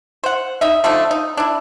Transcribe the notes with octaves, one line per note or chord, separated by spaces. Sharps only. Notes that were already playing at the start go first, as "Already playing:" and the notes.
C5 F#5
D#4 D#5 E5
D3 F3 A3 D#4
D#4
D4 E4